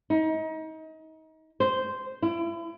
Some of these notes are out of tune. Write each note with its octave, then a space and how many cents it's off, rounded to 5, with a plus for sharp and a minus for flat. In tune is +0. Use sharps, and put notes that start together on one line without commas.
D#4 +30
C5 -10
E4 +35